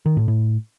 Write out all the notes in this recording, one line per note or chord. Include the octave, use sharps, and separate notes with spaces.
D#3
A2
A2